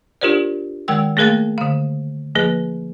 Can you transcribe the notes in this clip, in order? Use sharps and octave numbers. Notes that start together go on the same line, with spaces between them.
D4 F4 G4 A#4 C5 D5
D#3 G#3 A#4 G5 E6
A3 A#3 G#4 A#4 F5 A6
D3 F5
F3 A#3 G#4 B4